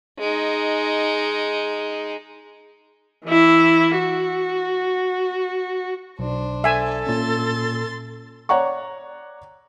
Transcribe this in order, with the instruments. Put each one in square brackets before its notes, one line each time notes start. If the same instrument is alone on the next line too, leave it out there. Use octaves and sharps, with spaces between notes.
[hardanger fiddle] G#3 D#4
[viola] E3 E4
F#4
[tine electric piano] B1 [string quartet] D4 C5
[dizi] A4 [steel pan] E5 G#5
[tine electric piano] A#2 C#4 [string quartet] C6 A6
[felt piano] C#5 D5 F#5 A#5 C#6